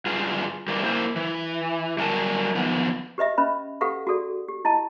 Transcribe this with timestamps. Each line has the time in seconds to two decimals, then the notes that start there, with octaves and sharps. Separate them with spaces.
0.06 G2 F4 G#4
0.68 E3 G3 G4 A#4
0.83 A#3 E4 C5
1.16 E3
1.99 F#3 G3 A#4 G#5 A5
2.55 D#3 F3 B3
3.18 G4 B4 D#5 E5
3.38 C#4 B4 D#5 B5
3.81 G4 A4 B4 F5 F#5 C#6
4.07 F#4 G#4 A4 D5
4.48 G4
4.65 E4 D#5 A5